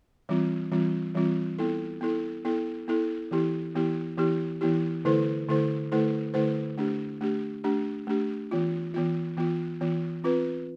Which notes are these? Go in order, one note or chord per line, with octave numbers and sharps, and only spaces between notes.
E3 G3 C4 F4
E3 G3 C4 F4
E3 G3 C4 F4
B3 E4 A4
B3 E4 A4
B3 E4 A4
B3 E4 A4
E3 B3 E4 G4
E3 B3 E4 G4
E3 B3 E4 G4
E3 B3 E4 G4
D3 A3 E4 A4 C5
D3 A3 E4 A4 C5
D3 A3 E4 A4 C5
D3 A3 E4 A4 C5
A3 D4 G4
A3 D4 G4
A3 D4 G4
A3 D4 G4
E3 B3 F4
E3 B3 F4
E3 B3 F4
E3 B3 F4
C4 F4 B4